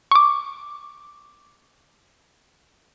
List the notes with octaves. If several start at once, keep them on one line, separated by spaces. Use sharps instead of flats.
C#6 D6